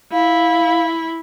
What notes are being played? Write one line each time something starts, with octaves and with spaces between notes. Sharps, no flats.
E4 F5